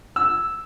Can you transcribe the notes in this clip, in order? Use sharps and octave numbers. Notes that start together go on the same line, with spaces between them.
E6